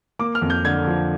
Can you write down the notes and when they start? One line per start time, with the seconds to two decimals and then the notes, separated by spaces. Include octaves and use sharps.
0.19 A#3 D6
0.35 F6
0.42 F2
0.50 G6
0.65 D3 G#6
0.87 F3